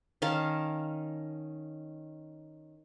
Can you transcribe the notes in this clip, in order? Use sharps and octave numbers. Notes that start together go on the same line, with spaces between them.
D#3 C#4 F5 A5